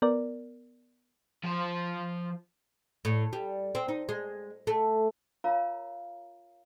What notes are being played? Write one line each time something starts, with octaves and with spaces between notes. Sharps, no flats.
B3 A#4 D5
F3 C5
A2
G3
C4
D#4
G#3
A3
F4 A#4 C#5 F5 A#5